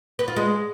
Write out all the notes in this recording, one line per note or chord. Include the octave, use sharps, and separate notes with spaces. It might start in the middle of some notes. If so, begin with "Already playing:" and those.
B4
F4
G#3